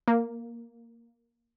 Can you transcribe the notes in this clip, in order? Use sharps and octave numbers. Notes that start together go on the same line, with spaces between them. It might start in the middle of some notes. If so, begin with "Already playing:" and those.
A#3